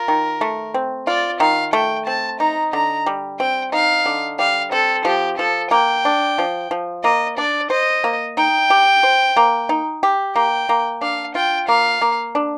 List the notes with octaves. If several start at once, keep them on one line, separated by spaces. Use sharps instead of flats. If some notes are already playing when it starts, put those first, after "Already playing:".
Already playing: F4 A#4
D#3
A3
C4
F4 D5
D#3 F5
A3 G5
C4 A5
D#4 A#5
D3 A#5
G3
C4 G5
D#4 F5
D3
G3 F5
C4 A4
F3 G4
F3 A4
A#3 G5
D4
F3
F3
A#3 D#5
D4 D5
C5 D#5
A#3
D#4 G5
G4
C5
A#3
D#4
G4
A#3 G5
A#3
D4 F5
F4 G5
A#3 F5
A#3
D4